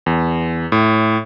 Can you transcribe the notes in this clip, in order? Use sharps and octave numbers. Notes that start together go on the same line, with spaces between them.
E2
A2